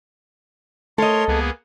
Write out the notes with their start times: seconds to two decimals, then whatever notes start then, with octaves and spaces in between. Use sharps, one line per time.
0.98 A3 A4 A#4 C#5 D#5 C6
1.28 C#2 A#3 B3 G#4